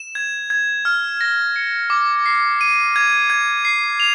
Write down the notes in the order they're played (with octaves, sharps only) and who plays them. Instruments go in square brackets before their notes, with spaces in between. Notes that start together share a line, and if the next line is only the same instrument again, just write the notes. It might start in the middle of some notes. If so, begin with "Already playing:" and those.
Already playing: [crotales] E7
G#6
G#6
F6
A#6
C#7
D6
C7
D#7
G#6
G#6
C7
F7